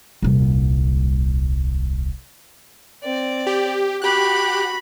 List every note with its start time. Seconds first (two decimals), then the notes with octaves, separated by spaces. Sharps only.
0.22 D#1 C2
3.03 C4 D5
3.47 G4
4.02 F#4 G4 B5 F#6